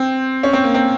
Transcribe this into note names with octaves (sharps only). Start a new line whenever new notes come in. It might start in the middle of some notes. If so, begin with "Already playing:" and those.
Already playing: C4
C#4
C4
A#3
C4